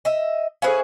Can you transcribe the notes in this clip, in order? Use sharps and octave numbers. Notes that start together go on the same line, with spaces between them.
D#5 E5
C#4 E4 G#4 A4 C5 F5